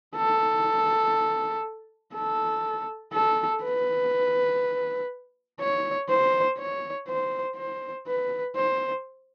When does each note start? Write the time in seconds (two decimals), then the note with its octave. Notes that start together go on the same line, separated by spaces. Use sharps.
0.16 A4
2.15 A4
3.13 A4
3.63 B4
5.60 C#5
6.09 C5
6.58 C#5
7.08 C5
7.57 C5
8.07 B4
8.56 C5